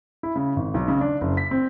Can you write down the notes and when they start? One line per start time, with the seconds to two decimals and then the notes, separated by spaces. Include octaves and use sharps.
0.23 E4
0.36 C#3
0.56 G#1
0.74 B1
0.88 C#3
1.01 D4
1.21 F#1
1.37 B6
1.51 C4